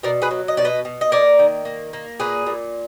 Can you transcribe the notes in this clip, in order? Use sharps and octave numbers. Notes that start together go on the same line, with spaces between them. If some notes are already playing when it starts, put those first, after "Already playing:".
B2 A#4 D5
G#4 B4
F#3
D#5
B2 D5
B4 D#5
B2
D#5
A#3 A#4 D5
D#3
A#3
A#3
A#2 G#4 B4
A#2